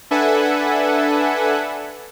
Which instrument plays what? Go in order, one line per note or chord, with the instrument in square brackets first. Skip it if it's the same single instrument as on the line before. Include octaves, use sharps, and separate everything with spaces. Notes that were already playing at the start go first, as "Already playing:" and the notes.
[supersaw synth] D4 A4 B4 E5 F#5 G#5